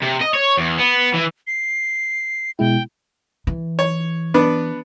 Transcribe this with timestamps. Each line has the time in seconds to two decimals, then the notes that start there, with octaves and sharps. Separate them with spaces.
0.02 C3
0.21 D#5
0.34 C#5
0.57 E2
0.78 B3
1.14 E3
1.47 C7
2.59 B2 G#3 E4 G5
3.47 E3
3.79 C#5
4.34 B3 D4 B4